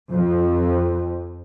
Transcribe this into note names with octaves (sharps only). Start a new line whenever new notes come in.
F2